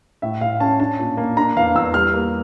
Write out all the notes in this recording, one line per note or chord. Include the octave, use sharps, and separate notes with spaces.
A2 E5
A2 F5
C#4 A5
D4 A5
A#2
A#3
D4 A#5
E2 F5
E2 E6
G3 F6
A#3